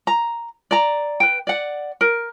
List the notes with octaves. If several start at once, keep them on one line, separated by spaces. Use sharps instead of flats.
A#5
D5 A#5
B4 G5
D5 F#5
A#4